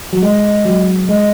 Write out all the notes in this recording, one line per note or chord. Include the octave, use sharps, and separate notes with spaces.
F#3
G#3 D#5
F#3
G#3 D#5